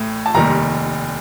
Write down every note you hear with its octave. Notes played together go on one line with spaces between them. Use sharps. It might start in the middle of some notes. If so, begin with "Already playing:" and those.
Already playing: A1 A2 A3
A5
F1 D#2 D#3 G3 A#5